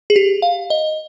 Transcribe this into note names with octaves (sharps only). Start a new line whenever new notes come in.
G#4
G4
F5
D#5